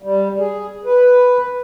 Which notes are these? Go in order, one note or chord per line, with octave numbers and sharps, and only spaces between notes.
G3
G#4
B4